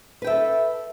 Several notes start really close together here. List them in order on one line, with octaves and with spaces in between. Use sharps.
B4 G5 E5 A4